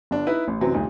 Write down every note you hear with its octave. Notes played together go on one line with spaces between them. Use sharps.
G1 D4
D#4 E4 B4
A1
F#2 C3 E3 F#3 C4
D#1 D2 D#4